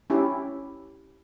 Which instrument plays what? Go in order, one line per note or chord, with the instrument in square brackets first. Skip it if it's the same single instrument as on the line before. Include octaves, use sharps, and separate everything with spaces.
[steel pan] C#4 E4 G4